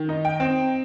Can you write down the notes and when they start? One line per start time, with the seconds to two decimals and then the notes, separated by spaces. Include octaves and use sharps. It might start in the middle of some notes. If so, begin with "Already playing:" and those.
Already playing: D#3
0.09 D#4
0.25 G5
0.40 C4